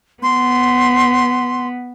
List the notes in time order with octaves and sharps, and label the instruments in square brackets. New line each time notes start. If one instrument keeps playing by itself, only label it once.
[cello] B3 [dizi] C6